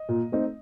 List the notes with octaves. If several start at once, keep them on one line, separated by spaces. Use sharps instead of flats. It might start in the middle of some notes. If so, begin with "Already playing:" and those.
Already playing: D#5
A#2
A3 C4 D#4